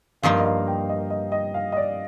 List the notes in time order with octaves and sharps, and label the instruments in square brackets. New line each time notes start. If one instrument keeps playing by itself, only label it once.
[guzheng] G2 F3 A#3 D#4 A#4 [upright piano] F5
[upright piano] D#5
F5
G5
D#5
D#5
D#5
F5
D#5
D5